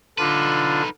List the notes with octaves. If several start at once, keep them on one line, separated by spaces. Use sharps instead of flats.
D3 D4 D#4 F4 B4